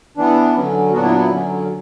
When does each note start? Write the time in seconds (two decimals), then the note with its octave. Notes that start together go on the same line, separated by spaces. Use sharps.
0.17 E3 B3 D4
0.55 D3 F#3 C#4
0.93 A#2 F#3 B3 D4 F#4
1.03 E4
1.11 D4
1.21 E4
1.31 D3 F#3 C#4